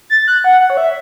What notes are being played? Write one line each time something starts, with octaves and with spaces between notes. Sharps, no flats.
A6
F#6
F#5
F#5
C#5
E5